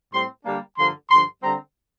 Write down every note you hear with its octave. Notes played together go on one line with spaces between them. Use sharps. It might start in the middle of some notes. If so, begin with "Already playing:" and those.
A2 G3 C4 C6
D3 G3 A#3 D4
G2 D3 F3 A#3 C6
G2 D3 F3 C6
D3 G3 C4 A#5